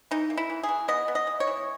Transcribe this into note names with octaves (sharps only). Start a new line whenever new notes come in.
E3 D#4
A#3
E4
E3
G#4
E3
B3 D#5
B3
D#5
E3
C#5
E3